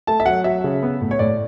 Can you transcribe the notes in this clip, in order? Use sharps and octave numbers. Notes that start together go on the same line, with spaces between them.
A3 A5
E5
F#3 F#5
F#3 E5
C#3
B3
A2
C#5
A2 D5